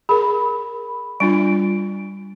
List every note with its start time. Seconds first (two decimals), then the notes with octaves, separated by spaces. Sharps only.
0.09 G#4 A#4 B5
1.20 G3 D4 F4 D7